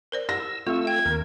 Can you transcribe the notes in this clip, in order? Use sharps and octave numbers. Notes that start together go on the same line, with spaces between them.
A#4 C5 D5
E6 A#6
A3 C4 F4 C#6 E6
G5 G#6
D#2 A#4